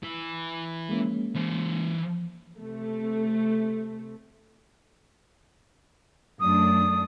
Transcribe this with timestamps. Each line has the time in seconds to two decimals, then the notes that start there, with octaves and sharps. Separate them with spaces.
0.03 E3 E4
0.89 G#3 A#3 C#4
1.35 E3 C5
2.59 C3 A3
6.40 F#2 A3 D4 D#6